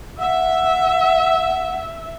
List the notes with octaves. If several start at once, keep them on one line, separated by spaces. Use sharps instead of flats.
E5 F#5